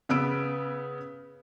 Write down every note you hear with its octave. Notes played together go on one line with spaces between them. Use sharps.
C#3 B3 B4 E6 D7